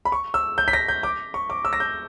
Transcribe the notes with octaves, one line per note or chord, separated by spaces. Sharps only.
B5
C#6
E6
G6
B6
A#6
G6
D6
C#6
D6
E6
A#6
G6